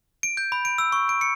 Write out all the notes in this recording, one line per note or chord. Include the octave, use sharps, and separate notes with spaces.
D7
G6
B5
D7
E6
C#6
D7
C#7